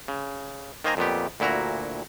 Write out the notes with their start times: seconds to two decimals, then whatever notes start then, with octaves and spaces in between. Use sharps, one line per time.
0.08 C#3
0.84 D#3 A#3 C5 D#5 G#5 A#5
0.97 F2 A#2 B3 G4
1.40 D2 A#2 E4 F#4 A#5